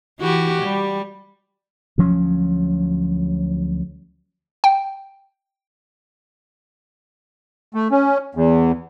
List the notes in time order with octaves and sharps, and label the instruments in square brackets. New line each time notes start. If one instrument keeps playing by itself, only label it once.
[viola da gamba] E3 F#4 G4
G3
[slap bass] D2 F3 F#3 C#4
[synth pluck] G5
[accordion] A3
C#4
E2